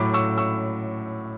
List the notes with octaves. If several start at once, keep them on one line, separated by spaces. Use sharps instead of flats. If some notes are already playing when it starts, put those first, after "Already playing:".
Already playing: A2 F#3 A3 B5 D6
C#6 E6
C#6 E6